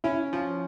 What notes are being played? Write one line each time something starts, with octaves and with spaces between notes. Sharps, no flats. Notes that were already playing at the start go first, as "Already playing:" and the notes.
C#4 E4
F3 F4